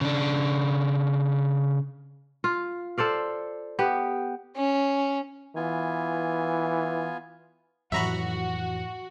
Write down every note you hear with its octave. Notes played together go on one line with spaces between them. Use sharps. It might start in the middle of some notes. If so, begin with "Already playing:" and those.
C#3 D4
F4
A4 C5 D5 F5
B3 G4
C#4
E3 B3 F4 G#5
A1 F2 F#3 F#4 E5 A#5 B5 C#6